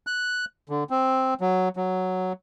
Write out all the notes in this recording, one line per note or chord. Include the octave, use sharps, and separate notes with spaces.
F#6
D3
C4
F#3
F#3